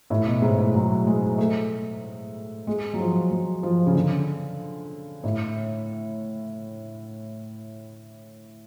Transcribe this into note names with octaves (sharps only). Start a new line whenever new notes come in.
A2
B2
G#2
A2
F#3
G#3
A3
G#3
F#3
F3
F#3
F3
C#3
D3
A2